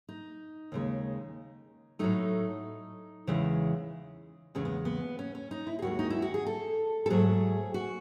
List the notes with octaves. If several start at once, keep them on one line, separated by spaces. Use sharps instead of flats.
D#4
D#2 C#3 G#3
A2 F#3 A3 D#4
E2 C#3 E3 G#3
E2 C#3 G#3 C#4
B3
B3
C#4
C#4
D#4
E4
G#4
D#2 D#3 G#3 F#4
D#4
E4
F#4
G#4
A4
A4
G#2 F#3 A3 G#4
F#4